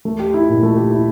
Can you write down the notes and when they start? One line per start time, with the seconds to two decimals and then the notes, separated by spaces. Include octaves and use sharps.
0.05 A3
0.20 G4
0.34 E4
0.49 A#2
0.63 A3
0.76 G4
0.91 E4